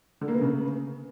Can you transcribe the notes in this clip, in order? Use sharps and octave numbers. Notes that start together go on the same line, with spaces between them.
D3
A#3
B3
C#3